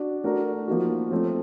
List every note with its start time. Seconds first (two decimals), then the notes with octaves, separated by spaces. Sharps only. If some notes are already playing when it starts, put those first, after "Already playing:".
Already playing: D4 F#4
0.24 A3 D4 F#4 A#4
0.68 F3 A#3 D#4 F#4
1.11 F3 A3 C4